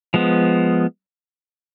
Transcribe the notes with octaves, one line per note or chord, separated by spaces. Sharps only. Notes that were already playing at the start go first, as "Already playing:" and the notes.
F3 G#3 B3